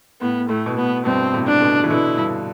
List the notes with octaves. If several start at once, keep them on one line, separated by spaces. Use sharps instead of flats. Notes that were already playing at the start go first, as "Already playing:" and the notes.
A2 B3
A2 A3
B2
A2 B3
G2 B2 C4
A2 C3
D4
B2 D3
E3
B2 D3 E4
G2 B2